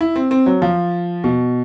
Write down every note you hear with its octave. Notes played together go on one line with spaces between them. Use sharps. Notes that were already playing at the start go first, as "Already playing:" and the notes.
E4
C4
C4
F#3
F3
B2